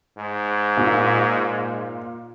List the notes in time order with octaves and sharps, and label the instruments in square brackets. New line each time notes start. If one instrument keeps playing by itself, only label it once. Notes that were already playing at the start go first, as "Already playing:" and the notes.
[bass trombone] G#2
[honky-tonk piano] A#2